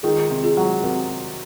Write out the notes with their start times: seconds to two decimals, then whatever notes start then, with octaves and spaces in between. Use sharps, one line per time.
0.03 D#3 F4 G#4
0.30 C3
0.44 F4 G#4
0.57 F#3
0.84 C3 F#4 A#4